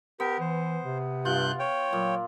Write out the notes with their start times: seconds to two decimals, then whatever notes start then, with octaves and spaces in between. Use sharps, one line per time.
0.20 B3 G4 A#4
0.40 E3 C5
0.83 C3
1.25 G2 F4 F#6 G6
1.59 C#5 G5
1.93 A#2 F#3